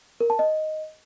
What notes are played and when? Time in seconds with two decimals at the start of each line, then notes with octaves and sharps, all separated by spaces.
0.21 A#4
0.30 A5
0.39 D#5